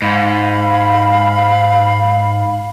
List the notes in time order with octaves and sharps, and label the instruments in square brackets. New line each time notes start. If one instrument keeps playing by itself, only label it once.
[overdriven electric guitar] G#2 [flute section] F5 B5